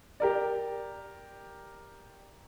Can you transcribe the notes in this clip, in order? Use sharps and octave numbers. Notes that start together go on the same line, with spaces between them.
G4 A#4 D5